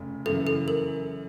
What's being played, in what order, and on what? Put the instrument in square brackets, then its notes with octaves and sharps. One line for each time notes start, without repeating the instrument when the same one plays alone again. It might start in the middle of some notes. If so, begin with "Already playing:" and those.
Already playing: [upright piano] F1 C#3
[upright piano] F#2 C#3 E3 [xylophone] A4
[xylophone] A4
A#4